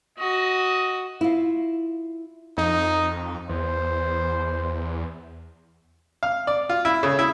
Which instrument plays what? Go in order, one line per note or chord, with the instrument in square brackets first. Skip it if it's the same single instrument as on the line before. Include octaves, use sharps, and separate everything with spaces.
[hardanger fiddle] F#4 [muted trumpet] D#5
[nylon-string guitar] E4 F4
[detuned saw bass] F2 [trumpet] D#4
[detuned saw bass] E2 [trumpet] C5
[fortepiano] F5
D5
F4
E4
C#3
E4